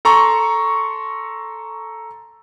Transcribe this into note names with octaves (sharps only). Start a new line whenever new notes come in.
A4 A#5 C6 C#6